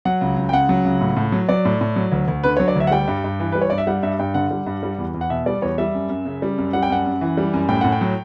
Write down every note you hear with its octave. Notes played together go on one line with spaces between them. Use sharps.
F#3 F#5
C#2
C#2
G5
C#3 F#5
F#3
C#2
A2
A2
F#3
F#3 D5
A2
A2
F#3
D2
D2
D3 B4
F#3 C#5
D5
D2 E5
F#5
G3 G5
G2
G2
E3
G3 B4
C#5
G2 D5
E5
G3 F#5
G2 E5
G2 G5
D3 F#5
G3
G2
G3
E2
E2
F#5
B2 E5
G3 D5
E2 C#5
G3 E5
F#2
F#2
C#3
G3
F#2
G3 F#5
G5
F#2 F#5
F#2
E3
G3
F#2
A2 G5
A2 F#5
G5
F#3